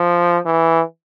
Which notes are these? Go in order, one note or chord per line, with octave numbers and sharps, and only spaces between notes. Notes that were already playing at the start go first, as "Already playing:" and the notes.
Already playing: F3
E3